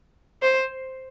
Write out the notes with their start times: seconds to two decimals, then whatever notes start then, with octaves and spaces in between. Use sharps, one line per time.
0.42 C5